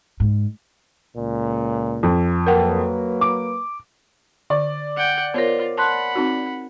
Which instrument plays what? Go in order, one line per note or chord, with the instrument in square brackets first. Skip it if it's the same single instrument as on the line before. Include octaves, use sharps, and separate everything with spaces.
[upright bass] G#2
[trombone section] C#2 A#2
[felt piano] F2
[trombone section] F#3 A#3 B4 [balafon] A#4 F#5 G5
[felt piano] D6
[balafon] D3 [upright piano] D5
[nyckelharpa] F#5 G5
[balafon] B3 [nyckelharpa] F4 [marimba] A#4 C5 C#5
[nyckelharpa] F#5 B5 [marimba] A5 C6 F#6
[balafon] C4 D#4 F#4